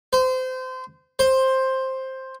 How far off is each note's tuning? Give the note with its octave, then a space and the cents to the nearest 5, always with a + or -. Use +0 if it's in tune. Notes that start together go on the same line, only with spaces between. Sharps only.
C5 -25
C5 +10